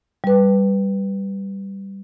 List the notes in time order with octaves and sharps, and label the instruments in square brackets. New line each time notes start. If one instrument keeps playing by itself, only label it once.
[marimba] G3 B4